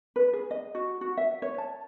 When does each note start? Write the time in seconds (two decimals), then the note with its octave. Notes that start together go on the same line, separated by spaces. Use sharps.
0.16 B4
0.33 G#4
0.51 D#5
0.75 F#4
1.01 F#4
1.17 E5
1.42 C#5
1.58 A5